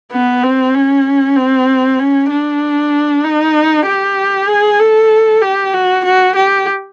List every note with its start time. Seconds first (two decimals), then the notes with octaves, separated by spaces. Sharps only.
0.12 B3
0.43 C4
0.75 C#4
1.36 C4
1.99 C#4
2.30 D4
3.24 D#4
3.86 G4
4.48 G#4
4.80 A4
5.42 G4
5.73 F#4
6.05 F#4
6.36 G4